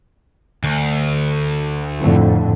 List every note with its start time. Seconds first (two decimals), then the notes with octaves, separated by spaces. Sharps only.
0.64 D2
2.00 F2 A2 D3